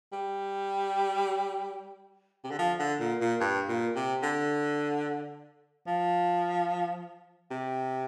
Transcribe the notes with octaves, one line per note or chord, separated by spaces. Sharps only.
G3
C3
D3
F3
D3
A#2
A#2
G2
A#2
C3
D3
F3
C3